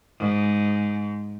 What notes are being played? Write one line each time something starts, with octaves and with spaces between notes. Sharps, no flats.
G#2